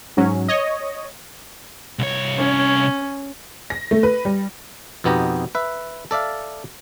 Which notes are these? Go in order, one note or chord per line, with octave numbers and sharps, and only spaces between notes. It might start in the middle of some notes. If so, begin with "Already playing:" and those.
G#2 F#3 C#4
C#5 D#5
C2 C#5
C#4
A#6
A3
B4
G3
F2 B2 B3 D#4 G4 A#5
B4 E5
A4 D5 E5 F5